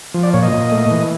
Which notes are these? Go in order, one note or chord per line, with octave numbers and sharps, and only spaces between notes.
F3
D5
A#2 C#5
D#5
A#2
A3
E3